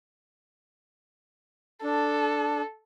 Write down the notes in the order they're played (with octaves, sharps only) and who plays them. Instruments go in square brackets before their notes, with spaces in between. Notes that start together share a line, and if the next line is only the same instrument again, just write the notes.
[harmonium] D4 [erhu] A4